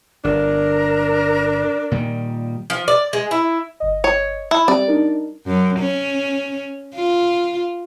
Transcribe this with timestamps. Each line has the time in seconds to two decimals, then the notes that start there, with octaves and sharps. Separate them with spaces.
0.24 G1 D4 A#4
1.91 A#2 D#3 G3
2.70 F3
2.88 D5
3.13 G#3
3.31 E4
3.80 G1 D#5
4.04 C#5
4.51 E4
4.68 G3 C4 G4 D5
4.88 D4 D#4 A#4
5.47 F#2
5.80 C#4
6.95 F4